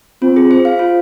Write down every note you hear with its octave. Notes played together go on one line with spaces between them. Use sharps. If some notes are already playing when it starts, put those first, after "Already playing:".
C4 F4
G#4
C5
F5
F4